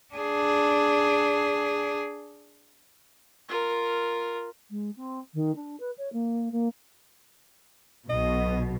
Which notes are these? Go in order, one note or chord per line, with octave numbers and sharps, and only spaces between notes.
D4 G#4
F4 A#4
G#3
C4
D#3
D4
B4
C#5
A#3
A#3
B1 B2 D#5